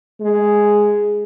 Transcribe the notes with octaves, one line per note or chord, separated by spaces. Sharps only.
G#3